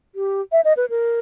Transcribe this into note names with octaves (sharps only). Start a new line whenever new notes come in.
G4
E5
D#5
B4
A#4